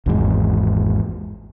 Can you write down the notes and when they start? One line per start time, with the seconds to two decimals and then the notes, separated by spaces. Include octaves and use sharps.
0.06 G#1 E2 G#2